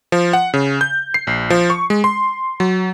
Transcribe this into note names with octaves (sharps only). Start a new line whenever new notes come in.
F3
F#5
C#3
G6
C7
A#1
F3
C#6
G#3
C6
F#3